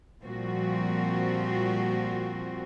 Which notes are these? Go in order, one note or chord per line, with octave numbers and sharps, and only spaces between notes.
A#2 F3 G3 C4 F#4